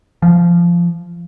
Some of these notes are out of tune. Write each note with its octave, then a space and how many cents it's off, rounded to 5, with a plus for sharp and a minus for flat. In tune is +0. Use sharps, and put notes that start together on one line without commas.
F3 -15